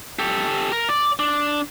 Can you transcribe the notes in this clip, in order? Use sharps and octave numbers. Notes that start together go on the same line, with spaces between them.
G4 A4
A#4
D5
D4